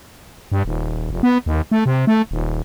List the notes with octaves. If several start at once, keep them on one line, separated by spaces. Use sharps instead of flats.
G2
D#1
F1
B3
D#2
A3
C3
A3
D#1